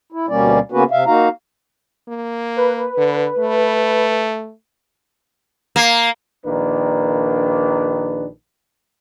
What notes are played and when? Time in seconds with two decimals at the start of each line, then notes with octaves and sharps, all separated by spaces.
0.12 E4
0.29 D2 B2 G3 A#3 C#4 D5
0.72 C#3 A#3 B3 C#4 F#4 B4
0.91 C3 E5 F5
1.06 A#3 D#4 F#4 F5 A#5
2.09 A#3
2.57 B4
2.97 D3
3.39 A3
5.76 A#3
6.46 A#1 D#3 A#3 D4 B4